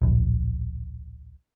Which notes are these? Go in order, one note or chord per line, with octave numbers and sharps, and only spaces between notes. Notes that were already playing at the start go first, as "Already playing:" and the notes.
D1 A#1